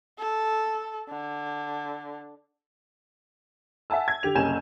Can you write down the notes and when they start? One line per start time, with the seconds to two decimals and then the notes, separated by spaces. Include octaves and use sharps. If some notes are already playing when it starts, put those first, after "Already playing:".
0.19 A4
1.09 D3
3.90 E5 F#5 G#5 A5 E6
4.08 G#6
4.23 D3 G4 F7
4.35 F#1 C2 C#4 G#5 G6 E7